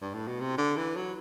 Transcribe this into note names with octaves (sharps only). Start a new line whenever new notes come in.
G2
A2
B2
C3
D3
E3
F#3